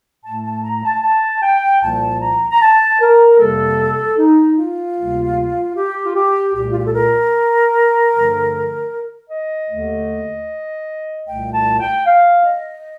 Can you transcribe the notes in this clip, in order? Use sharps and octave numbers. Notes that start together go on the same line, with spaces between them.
A2 A3 A5
A5
A#5
A5
A5
G5
C2 A#2 F3 A#3 A5
A#5
A#5
A5
A#4
F2 C3 G3 A#3 A4
D#4
F4
D2 C3 G3 A#3
G4
F4
G4
C2 A#2 A3 G4
F4
G4
A4
A#4
G2 D3 F3 A3
D#5
D#2 D3 A3
C2 A#2 A3 G5
A5
G5
F5
D#5